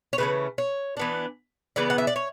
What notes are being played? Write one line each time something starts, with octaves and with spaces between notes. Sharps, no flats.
C#5
C#3 E3 A3 C#4 B4
C#5
E3 B3 D4
C#3 E3 B3 D5
F#5
E5
D5
C#5